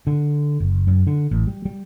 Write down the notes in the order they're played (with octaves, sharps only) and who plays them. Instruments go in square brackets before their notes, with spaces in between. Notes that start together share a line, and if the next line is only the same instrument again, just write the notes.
[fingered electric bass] D3
F#1
F#2
D3
A1
G3
G3